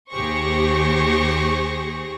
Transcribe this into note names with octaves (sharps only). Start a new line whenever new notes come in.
D#2 G4 G#4 C5 C#6 A#6